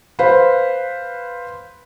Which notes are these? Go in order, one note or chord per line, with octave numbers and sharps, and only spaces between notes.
B4 C5 F5 B5